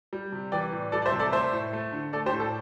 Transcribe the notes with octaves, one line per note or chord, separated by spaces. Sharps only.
G3
C3
E3 D5 G5
A2
G3 A4 D5
D5
C5 E5
C3
A4 D5
A3 C5 E5
A2
A3
D3
A3 A4 D5
G4 C5
A2
A4